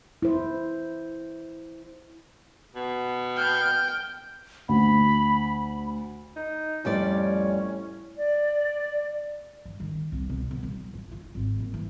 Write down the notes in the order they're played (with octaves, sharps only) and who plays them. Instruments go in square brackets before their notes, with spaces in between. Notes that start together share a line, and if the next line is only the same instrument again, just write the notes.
[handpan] E4 C5
[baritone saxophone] B2
[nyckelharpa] G5 [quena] F6
[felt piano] D2 [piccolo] B5
[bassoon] D#4
[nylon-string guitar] F2 G3 D5 [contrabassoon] A2 [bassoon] C#4
[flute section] D5
[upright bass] G2
D#3
C2
B2
B2
F#3
F4
F4
G#1
A#2
E3